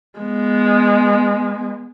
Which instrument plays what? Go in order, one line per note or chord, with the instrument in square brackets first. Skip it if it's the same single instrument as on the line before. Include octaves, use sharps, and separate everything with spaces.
[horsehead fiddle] G#3 B3